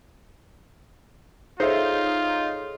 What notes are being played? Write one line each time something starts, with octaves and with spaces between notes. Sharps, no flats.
D#4 F4 G#4 A4 C5 C#5 E5